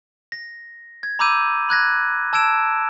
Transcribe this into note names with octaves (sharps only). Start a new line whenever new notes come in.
A#6
G#6
A#5 B5 D6 E6 G6 D#7
B5 F#6 G#6 A#6
A5 E6 G#6 D7 E7